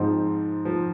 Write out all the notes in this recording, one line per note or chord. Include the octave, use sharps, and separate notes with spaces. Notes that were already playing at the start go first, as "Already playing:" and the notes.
Already playing: G#2 F3 C4 D#4
F3